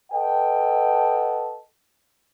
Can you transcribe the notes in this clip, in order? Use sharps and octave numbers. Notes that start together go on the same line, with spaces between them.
A4 B4 D#5 F#5 G5 A5